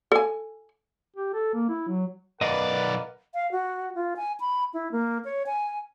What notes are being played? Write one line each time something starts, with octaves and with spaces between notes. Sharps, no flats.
A4 G#5
G4
A4
A#3
E4
F#3
B1 A#4 B4 D5 D#5 F5 F#5
F5
F#4
F4
G#5
B5
E4
A#3
C#5
G#5